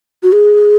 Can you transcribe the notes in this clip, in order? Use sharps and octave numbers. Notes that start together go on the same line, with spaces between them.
F#4
G#4